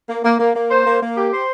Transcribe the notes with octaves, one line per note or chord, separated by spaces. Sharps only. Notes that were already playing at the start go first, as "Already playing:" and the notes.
A#3
A#3
A#3
A#3
C5
A#3
A#3
G4
C5